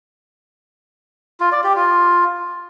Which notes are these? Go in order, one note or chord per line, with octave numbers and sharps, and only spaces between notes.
F4
D5
G4
F4